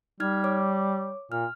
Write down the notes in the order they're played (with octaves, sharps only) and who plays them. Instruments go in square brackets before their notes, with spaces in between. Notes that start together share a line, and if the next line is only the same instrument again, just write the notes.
[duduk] G3 [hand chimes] D#4 F6 G#6
[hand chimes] C#5 D6
[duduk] A#2 [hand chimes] F6